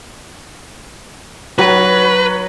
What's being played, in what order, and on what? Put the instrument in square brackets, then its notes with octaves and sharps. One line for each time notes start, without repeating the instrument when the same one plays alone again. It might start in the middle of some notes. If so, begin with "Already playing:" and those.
[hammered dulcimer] F#3 [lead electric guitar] B4